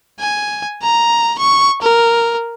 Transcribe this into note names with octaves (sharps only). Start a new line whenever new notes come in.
G#5
A#5
C#6
A#4